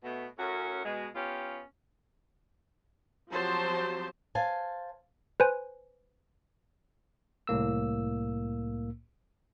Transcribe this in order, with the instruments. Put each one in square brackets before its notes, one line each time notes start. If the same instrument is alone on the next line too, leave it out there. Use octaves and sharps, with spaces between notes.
[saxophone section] B2 A3 B3
F#2 A2 C#4 F#4
B2 G#3
B3 C#4 F4 G4
[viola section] F3 F#3 C4 G4 C5 A5
[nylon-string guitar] C5 F5 G#5 A5
[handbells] B4 C5 G#5
[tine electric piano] C2 A2 A#3 E6